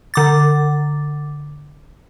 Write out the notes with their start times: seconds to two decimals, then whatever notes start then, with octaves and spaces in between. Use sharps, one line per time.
0.14 D3 D6 A6